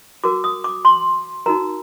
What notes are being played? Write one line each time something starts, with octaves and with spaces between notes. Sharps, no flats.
F#4 A#4 D6
D#6
D6
C6
D#4 F#4 A#4 A#5